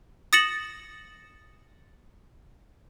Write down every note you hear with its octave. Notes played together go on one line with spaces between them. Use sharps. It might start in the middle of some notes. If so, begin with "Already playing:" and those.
D#6 A6 A#6 C#7 E7 F#7